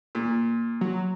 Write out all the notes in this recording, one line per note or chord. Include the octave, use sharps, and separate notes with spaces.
A#2
F#3